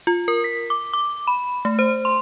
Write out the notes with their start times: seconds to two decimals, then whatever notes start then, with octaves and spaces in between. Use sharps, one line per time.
0.07 F4
0.28 A#4
0.44 B6
0.70 D6
0.93 D6
1.27 B5
1.65 A3
1.79 C5
2.05 C6